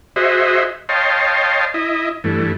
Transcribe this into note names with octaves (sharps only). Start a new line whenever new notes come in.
F#4 G#4 C5 D#5 E5
C#5 D#5 F5 G5 A5 C6
E4 D#5
G2 E3 A3